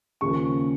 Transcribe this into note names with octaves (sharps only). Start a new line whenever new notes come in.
D#2 C#3 F3 A#3 C#4 C#6